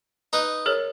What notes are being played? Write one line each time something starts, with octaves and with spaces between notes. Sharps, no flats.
D#4 B4
G#4 A#4 C#5